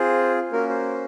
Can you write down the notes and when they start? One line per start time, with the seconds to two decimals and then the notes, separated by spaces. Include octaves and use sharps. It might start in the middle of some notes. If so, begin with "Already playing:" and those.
Already playing: C4 F4 G#4 C5
0.52 A#3 C#4 F#4 A#4
0.70 C5